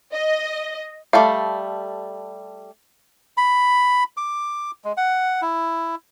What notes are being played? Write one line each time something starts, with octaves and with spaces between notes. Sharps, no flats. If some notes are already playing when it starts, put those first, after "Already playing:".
D#5
G3 A3 A4 F5
B5
D6
G#3
F#5
E4